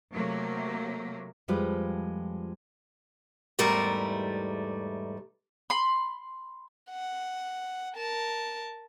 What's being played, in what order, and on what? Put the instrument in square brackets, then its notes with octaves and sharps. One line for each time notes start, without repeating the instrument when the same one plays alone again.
[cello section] C3 F#3 A3 A#3
[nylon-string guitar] F2 F3 G3 G#3 F4 B4
[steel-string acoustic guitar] E2 G#2 G3 A3 A#4
[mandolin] B5 C6
[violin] F#5
A#4 A5